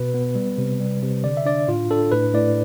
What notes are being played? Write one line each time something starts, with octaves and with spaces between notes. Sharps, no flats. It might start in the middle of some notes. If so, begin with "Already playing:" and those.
Already playing: B2 B4
B3
G3
C3
G3
C3
D3 D5
E5
D4 D5
A2 F4
D4 A4
A2 B4
A2 D5